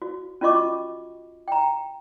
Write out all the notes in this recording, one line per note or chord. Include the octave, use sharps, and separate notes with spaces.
F#4
C#4 F4 F#4 D#5 C#6 D6
G5 A#5